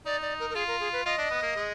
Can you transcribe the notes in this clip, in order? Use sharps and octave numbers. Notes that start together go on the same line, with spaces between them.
D#4 D5
D5
A#4
A#4
F4 G#4
A#4
G#4
B4
F4 D#5
D4
B3
A#3
G#3